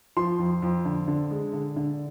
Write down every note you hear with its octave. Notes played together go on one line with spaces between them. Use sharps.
F3 C6
F2
F2
D3
D3
G#3
D3
D3